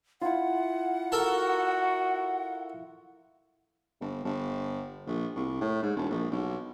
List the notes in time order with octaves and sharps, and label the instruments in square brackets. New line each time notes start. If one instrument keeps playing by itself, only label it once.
[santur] E4 F4 [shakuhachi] F#5
[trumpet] F#4 [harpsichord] A4 A#4 A5
[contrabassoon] G1
G1
A#1
C2
A2
G#2
E1
A#1
B1